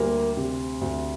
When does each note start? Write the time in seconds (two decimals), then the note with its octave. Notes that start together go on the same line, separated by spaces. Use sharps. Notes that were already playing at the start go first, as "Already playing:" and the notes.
Already playing: D2 G3 A#3
0.37 C3
0.81 D2